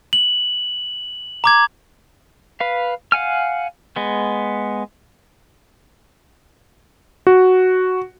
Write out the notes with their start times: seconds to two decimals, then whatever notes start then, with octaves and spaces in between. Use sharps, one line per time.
0.13 F#7
1.44 A#5 D6 G#6
2.60 B4 F5
3.12 F5 F#5 G#5 F6
3.96 G#3 B3
7.27 F#4